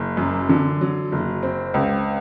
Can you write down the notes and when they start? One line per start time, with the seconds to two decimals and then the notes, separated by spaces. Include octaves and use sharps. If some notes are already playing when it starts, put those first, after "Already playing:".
Already playing: F#1
0.17 F#2
0.49 D3
0.81 F#3
1.12 F#1
1.43 C4
1.74 C#2